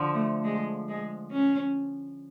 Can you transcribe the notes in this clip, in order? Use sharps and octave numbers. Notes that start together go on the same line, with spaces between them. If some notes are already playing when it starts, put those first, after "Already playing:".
Already playing: D3 F3
A3
G#3
G#3
C#4